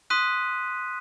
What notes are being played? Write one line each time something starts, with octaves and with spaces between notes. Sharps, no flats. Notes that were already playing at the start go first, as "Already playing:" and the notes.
C6 D#6 F#6 B6 D#7